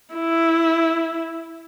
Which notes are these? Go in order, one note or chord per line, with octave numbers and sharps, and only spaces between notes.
E4